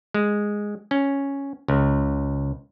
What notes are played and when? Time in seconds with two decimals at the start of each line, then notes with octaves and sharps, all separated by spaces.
0.14 G#3
0.91 C#4
1.68 C#2